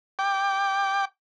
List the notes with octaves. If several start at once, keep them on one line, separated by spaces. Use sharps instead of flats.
G5 D6